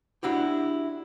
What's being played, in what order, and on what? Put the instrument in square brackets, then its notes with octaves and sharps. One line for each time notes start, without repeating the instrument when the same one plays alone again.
[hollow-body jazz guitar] D4 E4 F#4 G4